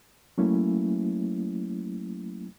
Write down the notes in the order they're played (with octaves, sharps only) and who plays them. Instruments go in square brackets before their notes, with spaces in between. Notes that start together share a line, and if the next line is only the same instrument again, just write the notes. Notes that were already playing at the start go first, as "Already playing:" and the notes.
[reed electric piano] F#3 A3 A#3 C#4 E4